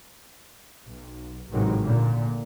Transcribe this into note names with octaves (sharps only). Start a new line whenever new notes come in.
B1
A1 G#2 C3 D#3 F#3 G#3
A#2 D3